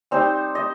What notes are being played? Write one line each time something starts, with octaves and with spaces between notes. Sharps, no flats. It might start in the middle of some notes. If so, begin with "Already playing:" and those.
G3 C4 D#4 C5
D#5